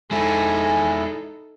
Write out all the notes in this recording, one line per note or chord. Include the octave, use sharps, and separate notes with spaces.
G#3 D#4 E4 A4 G#5